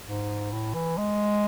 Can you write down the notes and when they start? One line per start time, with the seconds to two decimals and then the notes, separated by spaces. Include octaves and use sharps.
0.05 G#2
0.52 A2
0.74 E3
0.97 G#3